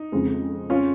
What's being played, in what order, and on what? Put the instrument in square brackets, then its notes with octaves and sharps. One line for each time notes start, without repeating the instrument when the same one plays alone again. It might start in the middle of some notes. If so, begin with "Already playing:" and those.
Already playing: [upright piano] D#4
[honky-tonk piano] F2 C#3 G#3 C4
[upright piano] C#4 F4